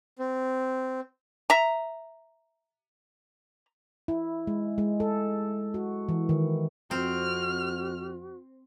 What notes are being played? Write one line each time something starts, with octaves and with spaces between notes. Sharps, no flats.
C4
E5 A#5
E4
G#3
G#3
A4
F#4
E3
D#3
F2 C4 F#4 F6